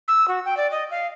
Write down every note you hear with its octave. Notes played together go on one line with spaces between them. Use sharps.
E6
F#4
G5
D5
D#5
F5